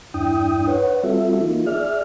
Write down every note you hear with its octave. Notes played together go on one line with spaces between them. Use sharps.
E2 G2 D4 E4 G5 D#6
B4 C#5 F#5
G3 C4 F4 F#4 A4 E5
E3 A#3 D#4 F4
G#4 D5 E5 F6